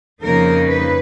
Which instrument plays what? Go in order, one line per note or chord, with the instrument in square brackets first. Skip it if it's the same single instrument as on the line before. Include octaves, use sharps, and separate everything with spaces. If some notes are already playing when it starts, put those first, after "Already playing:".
[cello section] F2 C#3 F3 A#3 D#4 A#4
B4